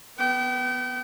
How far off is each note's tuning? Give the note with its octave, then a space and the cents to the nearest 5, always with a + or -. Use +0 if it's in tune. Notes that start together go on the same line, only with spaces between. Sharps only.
B3 +0 G5 -40